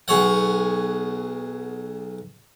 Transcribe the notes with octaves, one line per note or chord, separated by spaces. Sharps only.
B1 G#4 C#5 F#5